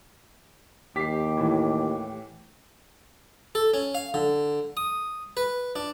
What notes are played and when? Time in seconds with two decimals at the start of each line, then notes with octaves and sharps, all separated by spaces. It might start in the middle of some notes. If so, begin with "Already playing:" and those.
0.96 D#2 G4 B6 C7
1.37 A2 E3
3.55 A4
3.74 C#4
3.95 F5
4.14 D3
4.77 D#6
5.37 B4
5.76 D4